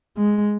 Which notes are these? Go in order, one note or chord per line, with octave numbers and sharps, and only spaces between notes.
G#3